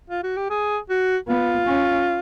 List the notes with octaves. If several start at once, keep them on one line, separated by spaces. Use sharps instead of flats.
F4
F#4
G4
G#4
F#4
B3 F4
C#4